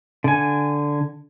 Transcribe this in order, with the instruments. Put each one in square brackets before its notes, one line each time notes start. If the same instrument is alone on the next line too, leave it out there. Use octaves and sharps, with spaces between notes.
[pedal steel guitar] D3 G#5